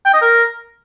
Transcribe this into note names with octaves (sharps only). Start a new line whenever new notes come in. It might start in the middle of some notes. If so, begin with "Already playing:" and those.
G5
D#5
A#4